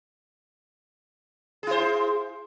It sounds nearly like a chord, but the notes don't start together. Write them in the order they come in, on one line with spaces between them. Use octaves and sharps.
G#4 E4 C5